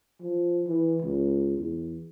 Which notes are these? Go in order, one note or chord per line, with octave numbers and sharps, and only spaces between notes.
F3
E3
C#2
E2